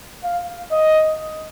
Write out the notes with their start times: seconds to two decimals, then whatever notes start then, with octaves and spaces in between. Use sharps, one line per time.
0.24 F5
0.71 D#5